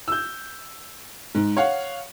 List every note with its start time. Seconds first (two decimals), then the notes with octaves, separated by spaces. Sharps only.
0.08 E6 G6
1.35 G#2
1.57 C#5 F5 F#5